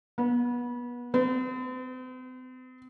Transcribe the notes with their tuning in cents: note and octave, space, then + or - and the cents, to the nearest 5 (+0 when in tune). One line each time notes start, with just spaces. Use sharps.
B3 -25
C4 -45